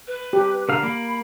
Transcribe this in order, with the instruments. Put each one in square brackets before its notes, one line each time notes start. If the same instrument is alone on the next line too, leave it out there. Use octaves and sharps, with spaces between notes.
[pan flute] B4
[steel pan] G4
[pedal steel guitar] D3 F5 [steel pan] A#4
[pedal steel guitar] A#3 [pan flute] B5